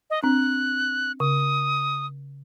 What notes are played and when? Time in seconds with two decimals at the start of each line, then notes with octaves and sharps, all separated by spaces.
0.10 D#5
0.23 C4 D4 F#6
1.20 C#3 D#6